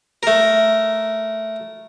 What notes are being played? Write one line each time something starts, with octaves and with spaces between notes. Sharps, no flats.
A3 A#4